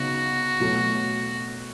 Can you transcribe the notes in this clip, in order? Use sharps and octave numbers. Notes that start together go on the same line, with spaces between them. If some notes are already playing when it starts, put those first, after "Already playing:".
Already playing: C#3 F#3 B3 D#4 F#4
B2 F#3 A3